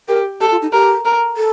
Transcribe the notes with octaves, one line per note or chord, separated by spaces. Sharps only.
G4 A#4
G4 A4
F4
D#4
G4 A#4
A#4
A4